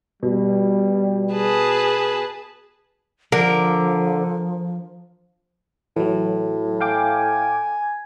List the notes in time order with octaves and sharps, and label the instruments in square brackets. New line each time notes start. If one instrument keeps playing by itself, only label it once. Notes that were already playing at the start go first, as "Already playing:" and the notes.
[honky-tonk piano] B2 [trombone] G3
[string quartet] G#4 B4 A5
[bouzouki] D3 [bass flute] F3 [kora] A#4
[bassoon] A2 [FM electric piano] E3 F#3
[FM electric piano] F5 G5 D6 [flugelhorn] G#5